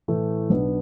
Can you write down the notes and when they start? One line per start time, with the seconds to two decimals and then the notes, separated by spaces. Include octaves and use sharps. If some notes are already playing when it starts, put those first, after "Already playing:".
0.08 A2 E3 A3
0.50 B1 B2 B3 D4